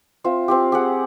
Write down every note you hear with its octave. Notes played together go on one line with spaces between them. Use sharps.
C4 F4 E5
C4 F4 G4
G4 G#4 F#5